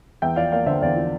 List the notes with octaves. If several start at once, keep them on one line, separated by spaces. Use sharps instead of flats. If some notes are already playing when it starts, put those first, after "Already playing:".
E2 E5 G5
F3 D5 F5
A#3 D5 F5
D3 C5 E5
E2 D5 F5
F3